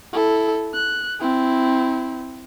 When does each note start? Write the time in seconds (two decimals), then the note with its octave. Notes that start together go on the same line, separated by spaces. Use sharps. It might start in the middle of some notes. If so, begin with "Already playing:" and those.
0.13 E4 A4
0.74 F#6
1.20 C4 E4